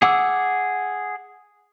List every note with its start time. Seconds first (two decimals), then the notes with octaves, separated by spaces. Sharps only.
0.02 G#4 F#5 D6 E6